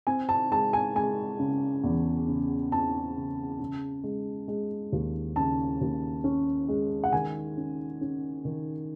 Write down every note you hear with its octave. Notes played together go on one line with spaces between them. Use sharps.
C4 G#5
A5
G#3 A5
G#5
G#3 G#5
C#3
E2
C#3
C4 A5
C#3
C#3
G#3
G#3
D#2
C#3 A5
D#2
C#4
G#3
F#5
D#3 G#5
C#4
C#4
D#3